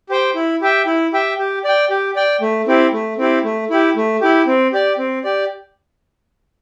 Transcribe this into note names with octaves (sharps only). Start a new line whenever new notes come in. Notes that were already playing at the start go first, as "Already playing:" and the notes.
G4 C5 G5
E4
G4 E5 G5
E4
G4 E5 G5
G4
D5 G5
G4
D5 G5
A3
C4 E4 G4
A3
C4 E4 G4
A3
E4 G4
A3
E4 G4
C4
G4 D5
C4
G4 D5